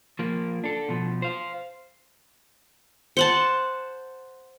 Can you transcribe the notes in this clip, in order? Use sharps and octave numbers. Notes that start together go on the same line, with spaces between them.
F3 A#3
D4 A4
B2 F3
C5 F5
C5 F#5 A5